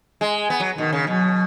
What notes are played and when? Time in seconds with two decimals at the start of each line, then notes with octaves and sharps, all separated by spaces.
0.21 G#3
0.50 B3
0.60 F#3
0.78 B2 D#3
0.92 C#3
1.07 B2 F#3